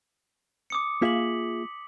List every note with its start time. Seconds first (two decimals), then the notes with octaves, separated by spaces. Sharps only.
0.70 D6 D#6 C#7
1.02 A#3 F4 G#4 E5 B6 F#7